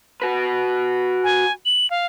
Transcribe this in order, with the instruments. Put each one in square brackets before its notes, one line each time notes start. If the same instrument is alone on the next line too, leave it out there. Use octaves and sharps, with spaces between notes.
[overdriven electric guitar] F#4 B4
[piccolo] G#5
F#7
F5